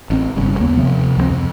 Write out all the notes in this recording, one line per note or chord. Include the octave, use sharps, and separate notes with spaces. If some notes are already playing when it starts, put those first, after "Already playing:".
A1 B3 C4
F#1 G2 C#3
D#2 A#3 B3
C3 F3
C#2 F3 F#3 C4
F2